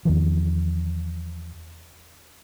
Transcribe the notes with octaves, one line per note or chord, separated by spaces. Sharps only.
E2 D#3 F3